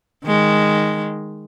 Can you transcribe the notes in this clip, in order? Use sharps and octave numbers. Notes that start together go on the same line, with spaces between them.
D#3 G#3